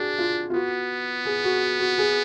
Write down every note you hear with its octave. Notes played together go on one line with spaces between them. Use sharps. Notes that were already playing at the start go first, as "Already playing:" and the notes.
Already playing: D4 F#4 G#4
F4
F4
B3 F#4
G#4
F#4
F#4
G#4